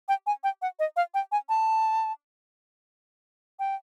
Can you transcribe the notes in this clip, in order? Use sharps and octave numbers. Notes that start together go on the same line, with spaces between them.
G5
G#5
G5
F#5
D#5
F5
G5
G#5
A5
G5